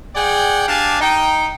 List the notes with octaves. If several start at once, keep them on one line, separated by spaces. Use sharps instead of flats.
G#4 D5 F#5 G5
D4 G4 F5 G#5 A5
D#4 G5